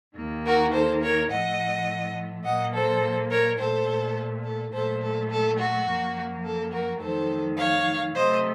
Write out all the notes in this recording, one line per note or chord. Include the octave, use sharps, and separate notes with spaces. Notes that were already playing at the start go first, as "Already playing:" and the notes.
D#2 D#3 A#3
F#4 A#4
A4 C5
A#4 C#5
A2 F3 A3 D#5 F#5
A#2 F#3 A#3 D#5 F#5
A4 C5
A#4 C#5
A#2 A3 A4 C5
A4
A#2 F#3 A3 A4 C5
A4
A4
F#4
F#2 F3 A#3
A4
F#4 A#4
F2 D#3 F#3 A3 A4 C5
C#5 F5
C3 F#3 A3 C5 D#5